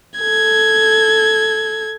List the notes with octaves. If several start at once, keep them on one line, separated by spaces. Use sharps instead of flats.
A4 G#6